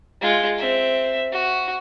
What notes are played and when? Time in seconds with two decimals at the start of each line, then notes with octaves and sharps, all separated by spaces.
0.21 G#3 F4
0.58 C4 E5
1.32 F#4